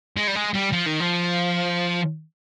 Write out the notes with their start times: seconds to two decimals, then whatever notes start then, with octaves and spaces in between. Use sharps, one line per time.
0.17 G#3
0.27 G3
0.35 G#3
0.54 G3
0.73 F3
0.87 D#3
1.01 F3